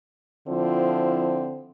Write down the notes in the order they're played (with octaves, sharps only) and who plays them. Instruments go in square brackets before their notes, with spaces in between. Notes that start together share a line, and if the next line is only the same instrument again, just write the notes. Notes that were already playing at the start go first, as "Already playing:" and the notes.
[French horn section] D3 F3 C4 E4 F4